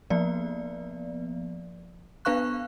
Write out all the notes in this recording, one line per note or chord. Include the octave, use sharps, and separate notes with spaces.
F3 A#3 B3 D5
B3 D4 B4 F5 C#6 F#6